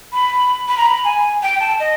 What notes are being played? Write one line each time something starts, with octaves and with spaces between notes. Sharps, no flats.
B5
B5
A#5
B5
G#5
G5
A5
D#5